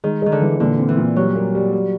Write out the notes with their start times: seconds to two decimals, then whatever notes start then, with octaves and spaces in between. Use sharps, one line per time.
0.04 D#3 G#3
0.22 D#3 G#3
0.32 D3
0.42 E3
0.60 A#2 D3
0.79 C4
0.88 E3
0.97 A#2
1.16 F#3 G3
1.35 A#3
1.55 G3
1.73 G3